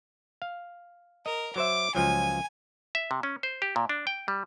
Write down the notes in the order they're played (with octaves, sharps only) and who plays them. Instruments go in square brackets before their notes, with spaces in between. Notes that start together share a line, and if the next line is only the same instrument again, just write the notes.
[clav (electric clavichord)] F5
[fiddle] A#4 [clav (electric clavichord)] D#5
[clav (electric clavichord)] F#3 C5 E5 [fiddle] D6
[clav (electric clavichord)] C#2 F3 F#3 [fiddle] G#5
[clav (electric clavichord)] E5
C3
C#4
C5
G4
A#2
D4
G5
G3